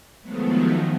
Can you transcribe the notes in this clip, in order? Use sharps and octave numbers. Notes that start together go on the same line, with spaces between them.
D#3 F3 F#3 G#3 A3 B3